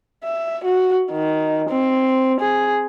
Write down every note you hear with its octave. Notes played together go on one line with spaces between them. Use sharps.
E5
F#4
D#3
C4
G#4